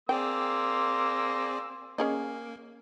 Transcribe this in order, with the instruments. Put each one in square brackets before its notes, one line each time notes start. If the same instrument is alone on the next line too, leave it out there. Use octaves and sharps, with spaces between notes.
[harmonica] A#3 C6 E6 [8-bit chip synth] C4 G#4 D5 [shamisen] G5
[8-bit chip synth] A#3 [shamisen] C#4 G#4 D#5